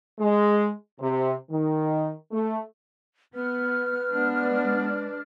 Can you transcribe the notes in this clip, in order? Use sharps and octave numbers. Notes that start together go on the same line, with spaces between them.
G#3
C3
D#3
A3
B3 B4 F6
G#3 B3 D4 D5